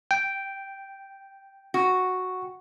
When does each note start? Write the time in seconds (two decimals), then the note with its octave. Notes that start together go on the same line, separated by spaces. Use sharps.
0.11 G5
1.74 F#4